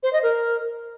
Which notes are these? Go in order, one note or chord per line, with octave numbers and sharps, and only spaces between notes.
C5
D#5
A#4